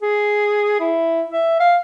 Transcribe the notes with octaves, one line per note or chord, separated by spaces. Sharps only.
G#4
E4
E5
F5